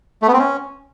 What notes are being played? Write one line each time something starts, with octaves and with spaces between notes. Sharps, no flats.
A3
B3
C4
C#4